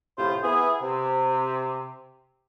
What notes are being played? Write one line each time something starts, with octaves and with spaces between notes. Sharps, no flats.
F2 A2 C3 B3 F4 C5
B3 E4 G#4
C3